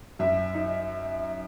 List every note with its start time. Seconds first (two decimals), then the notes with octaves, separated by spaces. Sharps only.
0.19 F#2 E5
0.54 D#4